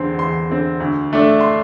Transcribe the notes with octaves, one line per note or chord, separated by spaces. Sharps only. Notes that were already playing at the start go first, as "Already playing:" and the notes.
Already playing: E2 D3 C4 C6
E2 C6
D3 C4
D2
D3 A3 D4
C6